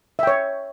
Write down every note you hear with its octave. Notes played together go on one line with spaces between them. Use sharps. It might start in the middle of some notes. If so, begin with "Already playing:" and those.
C#5 E5 G5